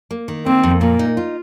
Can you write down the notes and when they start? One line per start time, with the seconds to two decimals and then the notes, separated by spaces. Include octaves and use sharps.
0.11 A#3
0.28 D#3
0.46 A#3 C4
0.63 F2
0.81 A#2 A#3
0.99 D#4
1.17 F4